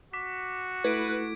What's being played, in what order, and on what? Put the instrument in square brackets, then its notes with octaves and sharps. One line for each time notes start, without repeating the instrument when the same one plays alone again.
[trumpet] F#4 [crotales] D6 B6
[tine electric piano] A3 E4 A4 [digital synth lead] B4 [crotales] G#6 B6 D7